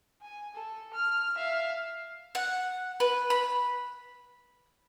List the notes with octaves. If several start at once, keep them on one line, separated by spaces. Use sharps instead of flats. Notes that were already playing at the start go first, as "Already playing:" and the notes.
G#5
A4
F6
E5 F5
F#5
B4
B5